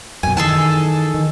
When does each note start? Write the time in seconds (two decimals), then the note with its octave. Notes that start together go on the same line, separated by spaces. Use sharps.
0.23 F#2 B2 G#5
0.37 D#3 E3 G#4 A4 A5
1.14 D#3